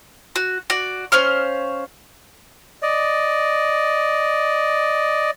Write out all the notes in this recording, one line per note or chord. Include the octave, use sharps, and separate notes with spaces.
F#4
F#4 D5
C#4 C5 F5 F6
D5 D#5